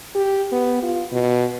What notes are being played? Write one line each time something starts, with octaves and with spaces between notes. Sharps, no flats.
G4
B3
F4
B2